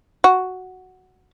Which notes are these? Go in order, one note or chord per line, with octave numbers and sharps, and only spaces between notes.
F#4